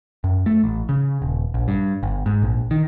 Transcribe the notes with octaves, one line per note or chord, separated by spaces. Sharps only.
F#2
A3
A1
C#3
D#1
A#1
G2
G1
G#2
A#1
D#3